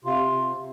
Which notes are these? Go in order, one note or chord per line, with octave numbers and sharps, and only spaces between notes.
C3 F4
C3
C3